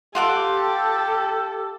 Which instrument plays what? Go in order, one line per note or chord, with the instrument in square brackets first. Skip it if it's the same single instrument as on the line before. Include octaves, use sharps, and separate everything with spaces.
[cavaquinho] F4 F#5 D6 [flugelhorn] G4 [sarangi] A4